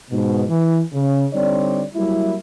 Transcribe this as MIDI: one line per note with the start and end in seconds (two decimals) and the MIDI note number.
0.11 0.43 44
0.11 0.43 47
0.48 0.81 52
0.93 1.25 49
1.32 1.83 50
1.32 1.83 55
1.32 1.83 60
1.32 1.83 63
1.32 1.83 73
1.32 1.83 74
1.95 2.35 54
1.95 2.35 55
1.95 2.35 58
1.95 2.35 64